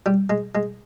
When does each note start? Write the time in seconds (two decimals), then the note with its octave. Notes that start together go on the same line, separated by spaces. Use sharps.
0.06 G3
0.30 G#3
0.55 G#3